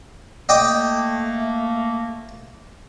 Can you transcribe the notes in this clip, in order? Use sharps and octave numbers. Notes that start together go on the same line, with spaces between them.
A3 A#3 D#5 G5 D6